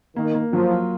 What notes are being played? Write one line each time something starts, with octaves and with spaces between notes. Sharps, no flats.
D#3 A#3
A#3
F3 F#3
F4